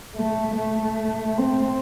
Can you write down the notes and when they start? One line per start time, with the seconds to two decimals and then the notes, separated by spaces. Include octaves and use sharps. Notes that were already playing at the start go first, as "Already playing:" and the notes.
0.16 A3
0.57 A3
1.38 C4